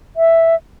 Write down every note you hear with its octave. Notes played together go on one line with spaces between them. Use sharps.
E5